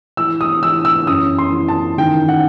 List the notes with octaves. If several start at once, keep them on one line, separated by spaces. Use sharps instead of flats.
E3 E6
D#6
E3 E6
E6
F#2 D#6
C6
E3
A5
D#3 G5
F#5